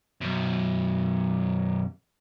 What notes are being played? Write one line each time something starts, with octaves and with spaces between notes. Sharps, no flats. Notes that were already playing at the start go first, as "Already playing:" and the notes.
F#2 B2